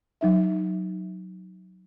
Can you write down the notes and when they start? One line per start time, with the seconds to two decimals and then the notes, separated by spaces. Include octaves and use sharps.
0.21 F#3 D#4 E5